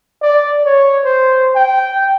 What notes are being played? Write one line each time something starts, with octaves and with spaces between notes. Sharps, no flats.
D5
C#5
C5
G5